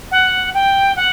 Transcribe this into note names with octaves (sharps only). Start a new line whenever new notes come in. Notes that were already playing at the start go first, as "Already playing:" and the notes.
F#5
G5
F#5